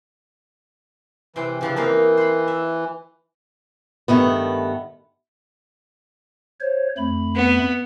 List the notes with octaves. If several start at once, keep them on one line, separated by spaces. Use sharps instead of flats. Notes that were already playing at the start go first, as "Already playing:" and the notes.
C3 E3 C4 G5
C#3 E3 F3 D4
E3 A#3 C4 D#4
C5 B5
E5
G2 D#3 A3 B3
C5 C#5
F2 A3 B5
B3